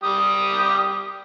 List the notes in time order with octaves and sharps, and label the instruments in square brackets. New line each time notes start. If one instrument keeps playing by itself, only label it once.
[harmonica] G3 G4 D#6